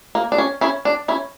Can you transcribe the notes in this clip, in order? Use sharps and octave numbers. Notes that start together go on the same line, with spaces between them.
A#3
D4
C#4
C#4 E4
D4
C#4 E4